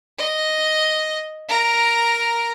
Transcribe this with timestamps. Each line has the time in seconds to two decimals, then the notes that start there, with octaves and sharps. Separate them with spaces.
0.18 D#5
1.49 A#4 A#5